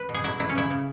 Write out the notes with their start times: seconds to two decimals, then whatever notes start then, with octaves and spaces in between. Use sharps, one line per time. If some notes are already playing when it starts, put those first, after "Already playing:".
Already playing: B4
0.09 B2
0.14 G#4
0.24 F#3 E4
0.39 F#3 E4
0.49 C#4
0.55 C#3 E4
0.70 C#3